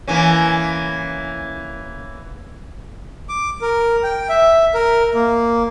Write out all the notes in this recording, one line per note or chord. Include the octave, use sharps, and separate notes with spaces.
E3 A#3 C#4
D6
A#4
G5
E5
A#4
A#3